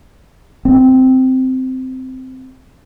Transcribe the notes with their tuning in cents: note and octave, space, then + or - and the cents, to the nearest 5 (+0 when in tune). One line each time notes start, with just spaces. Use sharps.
C4 -10